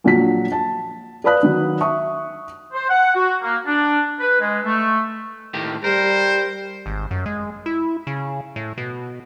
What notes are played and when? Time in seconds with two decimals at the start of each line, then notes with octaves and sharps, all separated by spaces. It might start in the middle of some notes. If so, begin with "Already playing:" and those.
0.04 A#1 F#3 D4 B6
0.52 A5
1.24 B4 D5 F5 B5 D#6 F#6
1.43 D#3 F#3
1.81 E5 C#6 D#6
2.72 C5
2.89 F#5
3.14 F#4
3.41 A#3
3.66 D4
4.19 B4
4.40 G#3
4.64 A3
5.54 A2 D#3 G4
5.84 G3 A#4 C5
6.86 G#1
7.11 F#2
7.26 G#3
7.66 E4
8.07 C#3
8.56 A2
8.78 B2